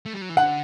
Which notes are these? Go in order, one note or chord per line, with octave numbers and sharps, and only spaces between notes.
A3
G3
F#3
E3
D3 F#5